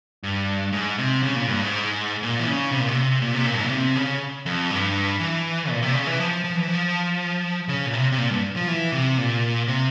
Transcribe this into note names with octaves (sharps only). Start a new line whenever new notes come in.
G2
G#2
C3
C#3
A#2
G2
G#2
A#2
E3
C#3
C3
A#2
C3
A#2
C3
A#2
G2
G#2
A#2
C3
C#3
F2
G2
E3
A#2
C3
C#3
E3
F3
F3
E3
F3
C#3
A#2
C3
C3
A#2
G2
F3
E3
C3
A#2
C3